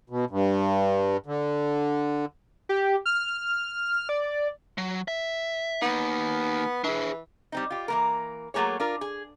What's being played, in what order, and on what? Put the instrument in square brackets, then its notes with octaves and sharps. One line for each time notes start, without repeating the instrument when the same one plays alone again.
[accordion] B2
G2
D3
[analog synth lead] G4
F6
D5
[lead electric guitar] F#3
E5
[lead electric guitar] A#3 D#4 [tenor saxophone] B3
[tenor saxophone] E3 [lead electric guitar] D4 G#4
[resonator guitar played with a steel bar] G3 C4 D#4
F4 G4
E3 A#3 A#4
F#3 A3 A#3 G#4 C#5
D4 F4 A#4
G#4